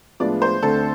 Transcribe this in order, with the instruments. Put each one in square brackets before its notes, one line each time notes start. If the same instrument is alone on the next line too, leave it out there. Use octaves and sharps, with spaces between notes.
[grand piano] A2 F3 G#3 B3 D4 [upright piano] D5
[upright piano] C5
[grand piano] D2 D3 A3 C4 [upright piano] A4